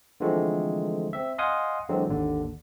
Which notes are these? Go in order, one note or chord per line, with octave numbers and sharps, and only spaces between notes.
D3 E3 F3 G#3 A3 C4
C4 E5
D#5 F5 F#5 G#5 C6 D#6
D3 E3 F#3 G#3 C4
G#1 D#2 D3